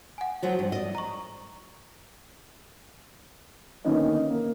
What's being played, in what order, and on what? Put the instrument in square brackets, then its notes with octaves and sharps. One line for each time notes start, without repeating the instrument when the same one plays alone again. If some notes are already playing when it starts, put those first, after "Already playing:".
[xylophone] F#5 G#5
[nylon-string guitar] F3 F#3 F#4
G2
D5 D#5
[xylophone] A#5 C#6
[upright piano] D3 D#3 A#3 B3 C#4 D#4
A#3